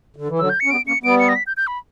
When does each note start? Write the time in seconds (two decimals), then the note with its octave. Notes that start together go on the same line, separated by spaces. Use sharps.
0.16 D3
0.28 E3
0.39 D3 F#3 E6
0.50 G6
0.60 C#7
0.65 C#4
0.71 G3 B3 D7
0.87 A#3 C#4 C#7
1.03 G3 B3 D7
1.20 C#7
1.29 A#6
1.36 B6
1.47 G6
1.57 G6
1.67 B5